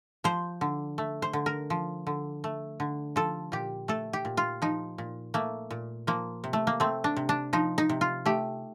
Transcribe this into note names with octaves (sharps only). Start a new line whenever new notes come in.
F3 C5
D3
A3
C5
D3
A#4
F3
D3
A3
D3
F3 A4
A#2 G4
A3 A4
G4
A#2
F4
F3 D#4
A#2
A3 A#3
A#2
F3 A#3
C3
A3
A#3
A3 C4
D4
C3
D4
F3 D#4
D#4
C3
F4
A3 G4